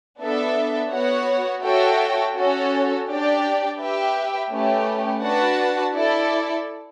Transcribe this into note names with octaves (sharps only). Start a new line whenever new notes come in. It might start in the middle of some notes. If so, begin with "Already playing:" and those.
B3 D4 A4 E5
B3 F#4 C#5 F#5
F#4 A4 C#5 E5 G5
C#4 F#4 A4
D4 G4 D5 G5
G4 B4 E5 G5
A3 C#4 G4 B4
D4 F#4 B4 F#5 A5
E4 A4 D5